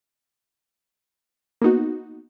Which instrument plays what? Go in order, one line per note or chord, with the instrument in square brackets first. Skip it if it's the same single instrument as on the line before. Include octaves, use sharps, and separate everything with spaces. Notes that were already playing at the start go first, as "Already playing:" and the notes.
[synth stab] A#3 B3 D#4 F#4